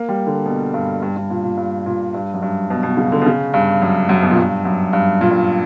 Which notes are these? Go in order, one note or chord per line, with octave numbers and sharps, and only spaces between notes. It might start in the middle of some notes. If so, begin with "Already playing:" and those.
Already playing: A#3
G3
D3
B2
G2
G2
G2
A#2
A#2
G2
A#2
G2
F#2
G2
B2
B2
C#3
D3
B2
C#3
G2
F#2
F#2
B2
A#2
G2
F#2
G2
A#2
G2